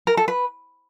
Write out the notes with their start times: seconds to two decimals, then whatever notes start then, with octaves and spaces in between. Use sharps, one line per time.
0.07 A#4
0.17 A4
0.28 B4